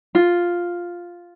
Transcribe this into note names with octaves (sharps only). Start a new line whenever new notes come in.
F4